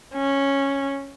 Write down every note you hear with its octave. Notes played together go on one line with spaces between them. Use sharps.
C#4